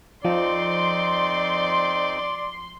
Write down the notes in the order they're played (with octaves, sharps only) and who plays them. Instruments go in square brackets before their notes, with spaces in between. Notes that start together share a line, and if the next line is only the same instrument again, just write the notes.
[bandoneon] F2 C4 D#4 [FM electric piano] F3 [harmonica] D5 [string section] C6